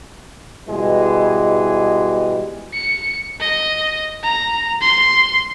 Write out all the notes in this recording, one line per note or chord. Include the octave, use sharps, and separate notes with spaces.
G#2 B2 E3 G3 G#3
C#7
D#5
A#5
C6